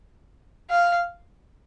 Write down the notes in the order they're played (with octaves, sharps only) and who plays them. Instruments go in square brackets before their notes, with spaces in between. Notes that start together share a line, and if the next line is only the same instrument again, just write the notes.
[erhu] F5